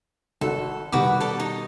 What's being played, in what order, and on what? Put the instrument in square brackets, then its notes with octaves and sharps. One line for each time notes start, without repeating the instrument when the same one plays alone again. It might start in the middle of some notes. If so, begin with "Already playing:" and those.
[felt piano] G#1 F#4 F#5 [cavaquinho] A4
[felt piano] B2 D#3 G3 [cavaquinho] F#4 B4 D6
[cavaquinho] A4 D5 A5
D#4